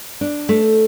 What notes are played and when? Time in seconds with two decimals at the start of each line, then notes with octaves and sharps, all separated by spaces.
0.21 D4
0.49 A3